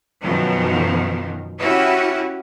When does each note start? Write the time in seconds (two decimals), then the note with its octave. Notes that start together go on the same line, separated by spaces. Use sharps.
0.22 F#2 B2 D#3 F3
1.60 C#4 E4 F#4 G4